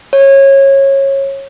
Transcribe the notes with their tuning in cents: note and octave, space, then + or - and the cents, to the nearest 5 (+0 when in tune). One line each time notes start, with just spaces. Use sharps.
C#5 -20